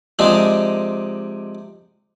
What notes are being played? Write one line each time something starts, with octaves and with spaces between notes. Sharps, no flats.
C3 F3 G#3 D4 D#4